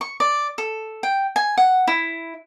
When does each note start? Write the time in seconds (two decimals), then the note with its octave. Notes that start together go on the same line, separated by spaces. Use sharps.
0.01 C#6
0.20 D5
0.58 A4
1.03 G5
1.36 G#5
1.58 F#5
1.88 E4